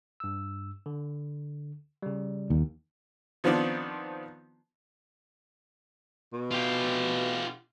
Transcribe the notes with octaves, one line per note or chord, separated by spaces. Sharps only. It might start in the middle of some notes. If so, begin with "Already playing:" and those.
G2 E6
D3
C#3 G3
D#2
D#3 F3 B3 C4 D4
B2
F4 G4